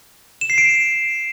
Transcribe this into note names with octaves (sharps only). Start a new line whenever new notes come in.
E7
C7
D7